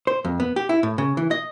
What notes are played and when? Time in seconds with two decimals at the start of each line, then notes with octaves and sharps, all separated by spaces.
0.07 C5
0.25 F2
0.40 B3
0.56 G4
0.69 E4
0.83 A2
0.98 C#3
1.17 E3
1.31 D#5